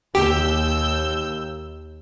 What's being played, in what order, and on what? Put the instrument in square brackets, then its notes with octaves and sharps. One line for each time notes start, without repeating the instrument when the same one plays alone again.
[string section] D#2 E6 G6 [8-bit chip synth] G4